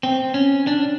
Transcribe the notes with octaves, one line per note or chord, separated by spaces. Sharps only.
C4
C#4
D4